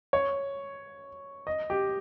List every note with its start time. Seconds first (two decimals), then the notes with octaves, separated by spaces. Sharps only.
0.13 C#5
1.47 D#5
1.70 G4